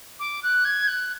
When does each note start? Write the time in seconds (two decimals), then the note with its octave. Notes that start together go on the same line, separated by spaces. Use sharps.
0.19 D6
0.43 F#6
0.65 G#6
0.88 F#6